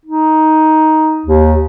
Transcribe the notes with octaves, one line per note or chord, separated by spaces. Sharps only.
D#4
D#2